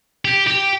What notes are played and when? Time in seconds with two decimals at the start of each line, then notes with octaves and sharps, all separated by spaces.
0.25 G4
0.47 G4